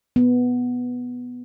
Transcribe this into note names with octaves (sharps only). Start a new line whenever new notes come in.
B3